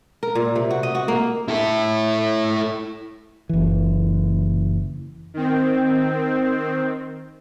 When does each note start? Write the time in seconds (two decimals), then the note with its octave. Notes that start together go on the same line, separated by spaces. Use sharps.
0.23 A#4
0.35 A#2
0.56 C3
0.71 F#4
0.83 D#5
0.95 F#4
1.08 A#3
1.48 E4 A4
3.49 F#1 E3
5.34 D#3 C4